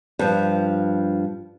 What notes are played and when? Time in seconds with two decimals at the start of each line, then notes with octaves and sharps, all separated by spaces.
0.19 G2 F3